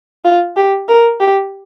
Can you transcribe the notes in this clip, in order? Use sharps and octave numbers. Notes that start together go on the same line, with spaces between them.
F4
G4
A#4
G4